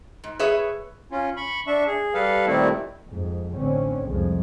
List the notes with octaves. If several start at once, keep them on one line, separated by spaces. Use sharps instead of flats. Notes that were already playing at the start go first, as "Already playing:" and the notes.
G#2
G#4 B4 C#5 E5
C#4 F4
B5 C#6
D4 E5 C#6
G#4
G3 A4 B4 F5
A#2 D#3 G3 A3 C4 E4
F2 G#2
A1 D3 C4 C#4
C2 F2 F3 G#3